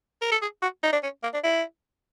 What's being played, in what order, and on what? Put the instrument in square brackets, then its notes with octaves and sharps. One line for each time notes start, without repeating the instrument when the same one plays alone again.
[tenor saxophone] A#4
A4
G#4
F#4
D#4
D4
C#4
A#3
D4
E4